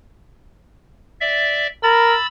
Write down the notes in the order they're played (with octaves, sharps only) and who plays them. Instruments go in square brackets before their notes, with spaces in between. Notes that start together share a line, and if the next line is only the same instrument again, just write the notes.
[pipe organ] D5 E5
[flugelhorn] A#4 [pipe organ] B5 E6 A6